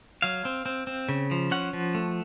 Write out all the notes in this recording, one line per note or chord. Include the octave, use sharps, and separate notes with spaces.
F#3 F5
C4
C4
C4
C#3
F3
C#4 F#5
F3
A3